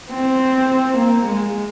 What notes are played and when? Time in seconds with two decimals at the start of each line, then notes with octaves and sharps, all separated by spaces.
0.10 C4
0.96 A#3
1.24 G#3